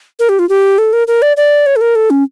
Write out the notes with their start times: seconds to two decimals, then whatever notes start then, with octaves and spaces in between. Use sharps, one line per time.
0.19 A#4
0.29 G4
0.39 F4
0.49 G4
0.78 A4
0.93 A#4
1.08 A#4
1.22 D5
1.37 D5
1.66 C#5
1.76 A4
1.81 A#4
1.95 A4
2.10 C#4